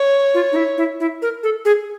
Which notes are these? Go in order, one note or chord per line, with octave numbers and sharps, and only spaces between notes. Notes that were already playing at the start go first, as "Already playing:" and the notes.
Already playing: C#5
F4
D#4
E4
E4
E4
A#4
A4
G#4